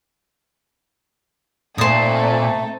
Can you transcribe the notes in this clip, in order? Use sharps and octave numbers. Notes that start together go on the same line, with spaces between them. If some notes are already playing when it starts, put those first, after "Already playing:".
A#2 A3 C4 D#4 A4 C5 D#6